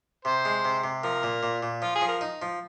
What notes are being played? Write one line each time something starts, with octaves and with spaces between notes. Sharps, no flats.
C3 C5
G#3
C3
C3
F3 A#4
A#2
A#2
A#2
F3 F4
G#4
F3
A#4
D#4
F3